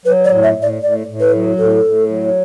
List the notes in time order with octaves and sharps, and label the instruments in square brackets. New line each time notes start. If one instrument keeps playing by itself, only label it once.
[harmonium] F#3 [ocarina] B4
[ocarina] D5
[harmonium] A2
[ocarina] E5
[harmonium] A2
[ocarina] D5
[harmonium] A2 [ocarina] D5
[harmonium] A2
[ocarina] B4
[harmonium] F#3
[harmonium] A2 [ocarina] A4
[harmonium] A2
F#3